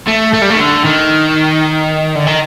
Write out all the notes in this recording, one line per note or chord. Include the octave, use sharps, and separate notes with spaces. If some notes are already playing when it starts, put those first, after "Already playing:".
A3
A3
G3
A3
D#3
D3
D#3
D3
D#3